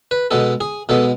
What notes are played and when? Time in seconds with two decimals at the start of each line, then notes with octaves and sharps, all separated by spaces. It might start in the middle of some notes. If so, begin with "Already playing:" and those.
0.11 B4
0.31 B2 G#3 B3 A4
0.61 G#4
0.89 B2 G#3 B3 A4